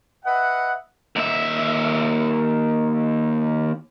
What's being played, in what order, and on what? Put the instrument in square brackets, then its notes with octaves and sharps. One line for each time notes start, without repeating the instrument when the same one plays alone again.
[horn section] B4 D#5 E5 F#5
[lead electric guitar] D#2 E5